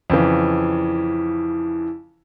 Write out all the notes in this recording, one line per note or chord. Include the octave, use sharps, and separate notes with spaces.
F2 C#3 E3